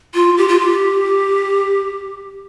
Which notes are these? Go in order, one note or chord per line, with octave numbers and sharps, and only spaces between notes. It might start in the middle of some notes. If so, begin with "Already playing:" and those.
F4
G4
F4
G4